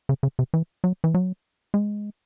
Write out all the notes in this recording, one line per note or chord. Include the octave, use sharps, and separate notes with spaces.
C#3
C#3
C3
E3
F#3
E3
F#3
G#3